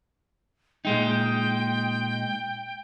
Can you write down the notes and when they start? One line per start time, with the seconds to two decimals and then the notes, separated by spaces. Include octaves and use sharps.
0.85 A#2 G#3 D#4 G5